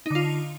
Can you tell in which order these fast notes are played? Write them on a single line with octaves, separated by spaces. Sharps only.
D#4 D3 F4